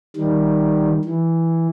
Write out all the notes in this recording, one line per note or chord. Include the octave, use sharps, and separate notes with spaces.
D#3 G3
E3